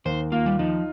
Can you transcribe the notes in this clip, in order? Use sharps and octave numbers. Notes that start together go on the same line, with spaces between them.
D#2 C5
A#3 F4
G3
F3 D#4